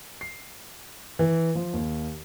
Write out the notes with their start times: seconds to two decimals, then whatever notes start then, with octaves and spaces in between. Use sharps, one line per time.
0.21 C7
1.19 E3
1.55 F3
1.73 D#2